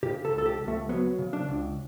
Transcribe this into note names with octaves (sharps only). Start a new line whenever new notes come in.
C#3 G4
A4
C#2
A4
G4
C#2
A3
F#3 B3
C#3
D4
C#2